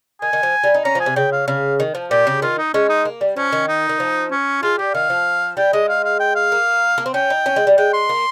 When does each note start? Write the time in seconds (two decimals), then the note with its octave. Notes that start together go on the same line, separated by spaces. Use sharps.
0.22 D#3 G#5
0.33 D#3
0.43 F3
0.64 G3
0.74 D#4
0.85 C#4 A#5
0.95 F3
1.00 G#5
1.06 C3
1.16 C#3 G5
1.32 F5
1.48 C#3 F5
1.80 D#3
1.95 F3
2.11 A#2 G4
2.27 C#3
2.42 D#3 F4
2.58 D#4
2.74 G#3 C#4
2.89 D#4
3.05 A#3
3.21 G3
3.36 F3 C#4
3.52 D#3
3.68 D#4
3.89 D#3
4.00 F3
4.31 C#4
4.63 G#3 F4
4.78 G3 G4
4.94 D#3 F5
5.10 F3
5.57 G3 G5
5.73 G#3 D#5
5.89 F5
6.05 F5
6.20 G5
6.35 F5
6.52 A#3
6.98 A#3
7.06 C4
7.14 C#4 G5
7.30 D#4
7.46 C#4
7.56 G#3
7.67 G3
7.78 G#3 G5
7.93 C6
8.09 A#3